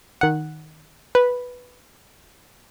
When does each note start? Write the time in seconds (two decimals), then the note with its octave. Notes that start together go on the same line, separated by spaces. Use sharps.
0.21 D#3 F#5
1.15 B4